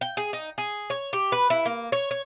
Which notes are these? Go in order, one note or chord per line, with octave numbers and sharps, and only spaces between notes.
G5
G#4
D#4
G#4
C#5
G4
B4
E4
A#3
C#5
C#5